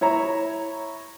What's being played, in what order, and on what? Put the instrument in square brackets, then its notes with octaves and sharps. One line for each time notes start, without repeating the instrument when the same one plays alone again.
[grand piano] E4 C#5 E5 A#5